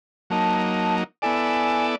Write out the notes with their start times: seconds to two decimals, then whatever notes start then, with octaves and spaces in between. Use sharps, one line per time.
0.30 F#3 A#3 D#4 A5
1.22 B3 E4 A4 D5 G#5